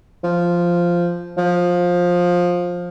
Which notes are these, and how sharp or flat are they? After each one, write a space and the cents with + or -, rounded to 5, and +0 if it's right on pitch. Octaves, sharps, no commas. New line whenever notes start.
F3 -5
F3 +15